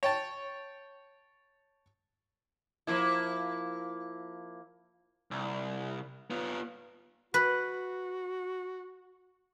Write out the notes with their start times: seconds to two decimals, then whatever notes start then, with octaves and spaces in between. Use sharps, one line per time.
0.03 C#5 G5 A5
2.87 F3 A#3 E4
5.31 C2
6.30 B3 F4
7.34 F#4 B4